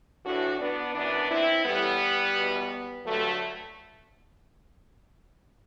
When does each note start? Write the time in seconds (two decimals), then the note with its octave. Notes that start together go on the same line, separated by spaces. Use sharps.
0.24 A2 E3 D4 F#4
0.60 B3 D4
0.94 F#2 E3 B3 D4
1.30 C4 E4
1.65 A2 E3 G3 B3
2.35 E2 B2
3.05 G2 D3 F#3 A3